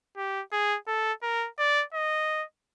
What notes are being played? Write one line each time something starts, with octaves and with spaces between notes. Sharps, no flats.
G4
G#4
A4
A#4
D5
D#5